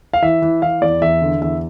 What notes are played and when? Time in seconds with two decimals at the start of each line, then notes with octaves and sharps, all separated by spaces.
0.13 F5
0.22 E3 E5
0.42 E3
0.62 E3 F5
0.82 E2 D5
1.01 E2 E5
1.22 D3
1.42 E2 E5